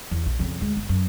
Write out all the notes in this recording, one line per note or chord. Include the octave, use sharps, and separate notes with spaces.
E2
A#1
F2 C#3
D2 G#3
G1
F#2